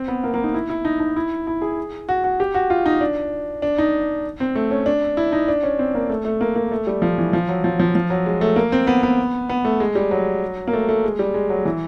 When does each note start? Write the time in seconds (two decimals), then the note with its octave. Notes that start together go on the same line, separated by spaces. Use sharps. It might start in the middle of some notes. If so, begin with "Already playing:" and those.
Already playing: C4
0.08 B3
0.23 A#3
0.34 A#3
0.44 D#4
0.54 E4
0.70 E4
0.85 D#4
1.00 D#4
1.16 E4
1.47 E4
1.62 G#4
2.09 F#4
2.24 F#4
2.40 G4
2.55 F#4
2.70 F4
2.86 D#4
3.01 D4
3.62 D4
3.78 D#4
4.40 C4
4.55 A3
4.71 C#4
4.86 D4
5.17 E4
5.32 D#4
5.48 D4
5.63 C#4
5.79 C4
5.94 A#3
6.09 A3
6.25 A3
6.41 A#3
6.56 A#3
6.72 A3
6.87 G3
7.02 F3
7.18 E3
7.33 F3
7.49 F#3
7.64 F3
7.79 F3
7.95 F3
8.10 F#3
8.26 G#3
8.41 A3
8.56 A#3
8.72 C4
8.87 B3
9.03 B3
9.49 B3
9.65 A3
9.80 G#3
9.95 G3
10.11 F#3
10.67 A#3
10.73 A3
10.89 A3
11.04 G#3
11.19 G3
11.34 G#3
11.50 F#3
11.65 E3